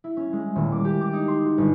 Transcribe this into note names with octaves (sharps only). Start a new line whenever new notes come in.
E4
C#4
G#3
D#1
D6
G4
D6
D#4
C6
F#4
G1